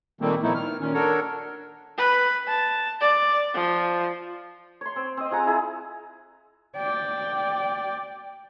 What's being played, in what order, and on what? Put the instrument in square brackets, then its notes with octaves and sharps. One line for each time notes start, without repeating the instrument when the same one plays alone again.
[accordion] A#2 D#3 G3 A3 A#3 C4
A#2 F3 A3 B3 D#4 E4
D#3 F6
A#2 D#3 C#4
D4 F#4 A4 A#4 C#5
[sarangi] B4
A5
D5
F3
[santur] C#5 C6
C4
C4 D#5
F4 G#4 F#5 A#5
E4 G#4
[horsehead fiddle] D5 G5